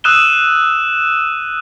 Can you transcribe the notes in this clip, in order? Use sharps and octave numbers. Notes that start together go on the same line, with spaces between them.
D#6 E6 F#6 D#7 E7 G7